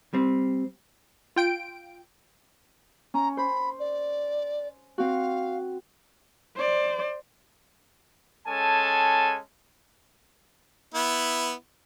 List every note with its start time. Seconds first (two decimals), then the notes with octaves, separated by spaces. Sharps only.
0.14 G3 C4
1.36 F4 G5 D7
3.14 C#4 A#5
3.37 C5 B5
3.79 D5
4.98 C4 F#4 F5
6.57 C5 D5
8.48 G#3 C#4 A4 G#5 A5
10.94 B3 E4